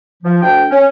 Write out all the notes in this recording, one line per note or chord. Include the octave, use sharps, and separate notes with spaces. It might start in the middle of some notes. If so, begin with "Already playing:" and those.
F3
D2 D4 G5
C#4